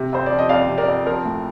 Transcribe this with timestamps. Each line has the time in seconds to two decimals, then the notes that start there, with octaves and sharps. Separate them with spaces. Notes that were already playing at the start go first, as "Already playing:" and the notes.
Already playing: C3
0.13 F2 C5
0.26 F3 D5
0.38 D#5
0.49 F2 D5 F5
0.69 C3
0.78 A#4 D5
0.88 F2
1.06 F3 A#4
1.25 A2